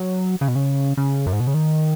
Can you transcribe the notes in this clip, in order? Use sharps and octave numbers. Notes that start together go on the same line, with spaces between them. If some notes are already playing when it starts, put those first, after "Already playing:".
Already playing: F#3
C#3
B2
C#3
C#3
F#2
G#2
B2
C#3
D#3